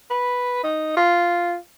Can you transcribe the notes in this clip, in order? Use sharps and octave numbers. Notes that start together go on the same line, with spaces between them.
B4
D#4
F4